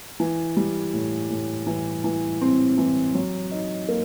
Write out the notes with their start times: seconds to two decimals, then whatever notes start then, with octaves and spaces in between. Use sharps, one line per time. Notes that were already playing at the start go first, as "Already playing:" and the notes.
0.20 E3
0.57 G3
0.94 A2
1.30 A2
1.67 E3
2.04 E3
2.42 C4
2.78 E3
3.15 F#3
3.51 D#4
3.89 A#3